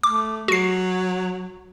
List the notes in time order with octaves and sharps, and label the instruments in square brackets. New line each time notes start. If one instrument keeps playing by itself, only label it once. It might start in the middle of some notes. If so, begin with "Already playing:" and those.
[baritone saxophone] A3 [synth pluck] D6
[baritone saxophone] F#3 [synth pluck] F#4 C7